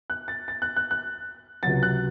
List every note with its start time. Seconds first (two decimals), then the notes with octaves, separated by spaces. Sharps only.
0.10 F#6
0.28 A6
0.48 A6
0.62 F#6
0.76 F#6
0.91 F#6
1.63 C#2 C3 F#3 A6
1.83 F#6